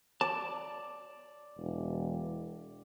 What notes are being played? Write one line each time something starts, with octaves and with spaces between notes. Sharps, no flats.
D5 A5
E1